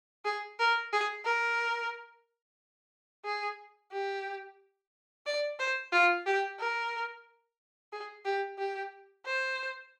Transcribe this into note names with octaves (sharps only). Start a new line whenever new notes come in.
G#4
A#4
G#4
A#4
G#4
G4
D5
C5
F4
G4
A#4
G#4
G4
G4
C5